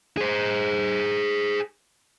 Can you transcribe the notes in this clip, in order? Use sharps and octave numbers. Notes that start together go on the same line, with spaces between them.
G#4 C5